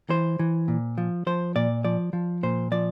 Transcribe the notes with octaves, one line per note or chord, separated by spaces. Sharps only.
E3 C5
E3
A#2
F3
F3 C5
A#2 D5
F3 D5
F3
A#2 C5
F3 D5